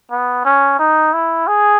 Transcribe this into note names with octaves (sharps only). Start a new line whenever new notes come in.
B3
C#4
D#4
E4
G#4